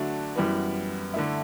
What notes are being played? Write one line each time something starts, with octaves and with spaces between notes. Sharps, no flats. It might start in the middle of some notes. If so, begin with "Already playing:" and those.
Already playing: D3 F#3 A3 D4 F#4
F#2 E3 G3 B3
D3 A3 E4